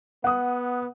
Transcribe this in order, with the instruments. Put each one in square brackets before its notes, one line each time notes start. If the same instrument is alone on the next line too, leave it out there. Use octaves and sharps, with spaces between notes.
[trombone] B3 [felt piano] F#5 D#6